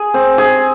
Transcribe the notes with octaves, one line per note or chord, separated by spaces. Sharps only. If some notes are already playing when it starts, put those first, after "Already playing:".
Already playing: G#4
C4
G#4